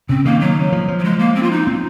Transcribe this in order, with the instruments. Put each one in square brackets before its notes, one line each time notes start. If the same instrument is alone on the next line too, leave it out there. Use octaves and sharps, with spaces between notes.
[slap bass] C#3 [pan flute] C4
[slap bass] D#3 [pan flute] A#3
[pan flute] F#3
[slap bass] F3
F3
[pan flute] F#3
G#3
A#3
C4
F4
D#4
[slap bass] C4